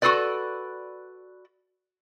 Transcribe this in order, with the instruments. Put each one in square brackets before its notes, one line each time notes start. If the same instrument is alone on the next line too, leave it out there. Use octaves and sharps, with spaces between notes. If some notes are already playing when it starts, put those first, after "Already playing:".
[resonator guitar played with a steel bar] F#4 G#4 A4 B4 D5